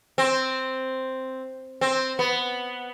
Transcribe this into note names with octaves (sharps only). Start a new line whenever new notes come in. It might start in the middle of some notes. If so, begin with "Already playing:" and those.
C4
C4
B3